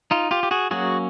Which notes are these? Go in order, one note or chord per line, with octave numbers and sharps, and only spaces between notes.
D#4 F4
F4 G4
G4
F#4 G#4
F#3 A#3 C#4 F#4 G#4